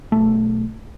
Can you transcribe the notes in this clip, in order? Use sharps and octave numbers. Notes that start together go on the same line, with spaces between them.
B1 A3